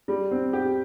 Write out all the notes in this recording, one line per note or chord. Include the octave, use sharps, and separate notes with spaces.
G3
C4
G4